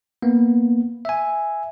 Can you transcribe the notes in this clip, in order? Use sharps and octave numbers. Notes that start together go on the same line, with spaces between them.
A#3 B3
E5 G#5